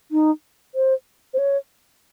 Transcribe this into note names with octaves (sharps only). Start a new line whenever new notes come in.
D#4
C5
C5
C#5